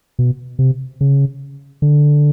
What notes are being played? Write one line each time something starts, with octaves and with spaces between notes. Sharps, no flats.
B2
C3
C#3
D3